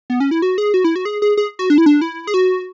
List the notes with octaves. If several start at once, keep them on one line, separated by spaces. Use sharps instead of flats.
B3
C#4
E4
F#4
G#4
F#4
E4
F#4
G#4
G#4
G#4
F#4
D4
E4
D4
E4
G#4
F#4